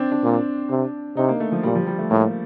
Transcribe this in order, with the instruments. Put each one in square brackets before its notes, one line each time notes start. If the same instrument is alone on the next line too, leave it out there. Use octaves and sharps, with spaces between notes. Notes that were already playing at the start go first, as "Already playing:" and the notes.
Already playing: [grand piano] C4 D4
D4
[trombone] A#2
C3
[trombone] C3 [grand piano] D#4
[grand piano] A#3
A3
F3
[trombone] A#2 [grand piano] G3
[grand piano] F3
G3
A3
[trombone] A2 [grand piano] A#3